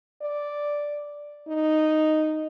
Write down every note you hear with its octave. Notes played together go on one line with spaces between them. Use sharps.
D5
D#4